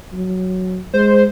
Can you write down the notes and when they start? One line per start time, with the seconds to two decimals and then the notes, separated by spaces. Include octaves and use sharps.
0.12 F#3
0.94 G#3 C5